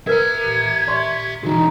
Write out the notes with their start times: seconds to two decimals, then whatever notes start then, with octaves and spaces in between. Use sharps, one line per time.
0.07 A#4 B4 E5 A#5 G#6
0.87 D5 C6 C#6
1.43 B2 E3 D#4 F#4